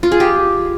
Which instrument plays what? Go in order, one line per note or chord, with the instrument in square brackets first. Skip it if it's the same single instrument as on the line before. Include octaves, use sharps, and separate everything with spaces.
[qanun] F4
G#4
G4